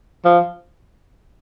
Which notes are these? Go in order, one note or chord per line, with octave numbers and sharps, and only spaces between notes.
F3